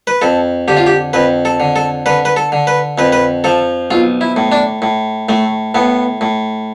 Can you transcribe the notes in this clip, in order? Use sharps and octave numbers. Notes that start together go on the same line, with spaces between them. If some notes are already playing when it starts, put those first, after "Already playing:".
B4
F2 A4
D3 G4
F4
G4
F2 B4
A4
D3
A4
D3 B4
B4
A4
D3
B4
F2 B4
B4
F3 A4
B1 F4
E4
A2
D4
A2
A2 A3
A2 B3
A2